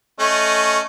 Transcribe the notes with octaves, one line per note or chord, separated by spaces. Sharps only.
A3 C#4 D#5